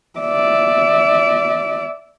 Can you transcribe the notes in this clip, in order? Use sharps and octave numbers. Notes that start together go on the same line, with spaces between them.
D5 E5